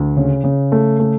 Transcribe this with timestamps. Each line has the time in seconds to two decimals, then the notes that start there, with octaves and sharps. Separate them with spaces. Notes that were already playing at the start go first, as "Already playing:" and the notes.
Already playing: D2
0.17 C#3
0.44 C#3
0.72 A3
1.00 A3